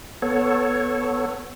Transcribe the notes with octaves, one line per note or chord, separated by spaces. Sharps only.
B3 A4 C#5